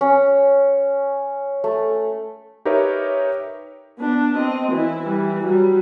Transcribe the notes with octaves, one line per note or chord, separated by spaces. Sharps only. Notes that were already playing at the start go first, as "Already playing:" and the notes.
C#4
A3
D#4 G4 A#4 B4 C#5 E5
B3 D4
C4 D#5
E3 E4
E3 G3
F#3 G3